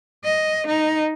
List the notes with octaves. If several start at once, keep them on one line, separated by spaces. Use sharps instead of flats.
D#5
D#4